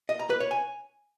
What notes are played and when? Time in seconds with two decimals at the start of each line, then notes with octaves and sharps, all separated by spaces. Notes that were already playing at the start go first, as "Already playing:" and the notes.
0.09 D#5
0.19 A#5
0.30 B4
0.40 C#5
0.51 G#5